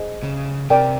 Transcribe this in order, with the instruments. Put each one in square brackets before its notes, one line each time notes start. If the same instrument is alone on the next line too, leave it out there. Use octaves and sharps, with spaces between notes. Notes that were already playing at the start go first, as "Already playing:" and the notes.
Already playing: [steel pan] G#4 C5 D#5
[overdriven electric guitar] C#3
[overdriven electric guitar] C3 [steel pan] A#4 D5 G5